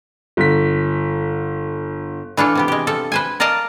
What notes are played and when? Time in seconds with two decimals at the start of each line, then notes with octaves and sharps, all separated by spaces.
0.37 G1 B6
2.37 E3 D4 F4 A4
2.55 C3 B3 G4
2.68 G#3 G4
2.87 F3 A4
3.12 B4 C5 G#5
3.40 A#4 D5 D#5 F5 A5